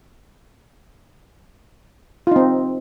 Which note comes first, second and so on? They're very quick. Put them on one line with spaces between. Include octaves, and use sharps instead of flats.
F4 D#4 C4